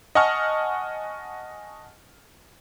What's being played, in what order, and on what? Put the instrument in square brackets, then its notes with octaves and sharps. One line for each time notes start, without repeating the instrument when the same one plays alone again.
[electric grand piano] D#5 F#5 G#5 A5 C#6 F6